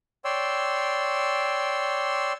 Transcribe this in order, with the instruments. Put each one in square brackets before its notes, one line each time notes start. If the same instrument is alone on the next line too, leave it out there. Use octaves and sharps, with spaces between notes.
[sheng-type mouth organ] C#5 D5 G5 C6 E6